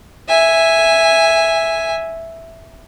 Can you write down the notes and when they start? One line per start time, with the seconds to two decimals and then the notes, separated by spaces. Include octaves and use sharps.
0.29 E5 G#5